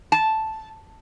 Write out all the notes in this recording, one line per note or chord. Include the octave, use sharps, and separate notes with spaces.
A5